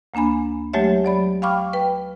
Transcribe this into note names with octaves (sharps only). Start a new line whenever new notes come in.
D2 A#3 D4 G#5 B5
F#3 G#3 A3 G4 C#5 E5
F#3 D5 B5
F5 G5 B5 C#6 D6 F6
B4 G5